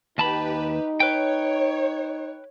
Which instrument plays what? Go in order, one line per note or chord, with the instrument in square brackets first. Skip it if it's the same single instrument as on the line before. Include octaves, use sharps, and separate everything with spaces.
[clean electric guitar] D#2 A5 B5 [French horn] D#4 [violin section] G4 B4
[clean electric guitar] B4 G5 [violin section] C#5